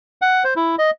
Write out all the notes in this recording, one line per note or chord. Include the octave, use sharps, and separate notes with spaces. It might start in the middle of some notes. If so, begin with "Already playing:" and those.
F#5
C5
E4
D#5